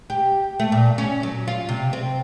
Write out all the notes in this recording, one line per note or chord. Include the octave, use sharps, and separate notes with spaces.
G4
A3
A#2
C#4
F#3
F4
C3
C4